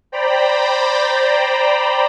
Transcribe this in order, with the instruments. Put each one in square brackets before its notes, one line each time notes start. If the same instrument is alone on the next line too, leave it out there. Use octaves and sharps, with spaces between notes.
[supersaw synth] C5 D5 G5 A#5 B5